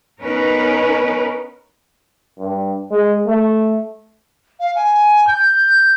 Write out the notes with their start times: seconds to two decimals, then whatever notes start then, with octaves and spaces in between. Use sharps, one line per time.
0.21 B3 C#4 D#4 A#4 B4
2.39 G2
2.91 G#3
3.26 A3
4.59 F5
4.75 G#5
5.27 G6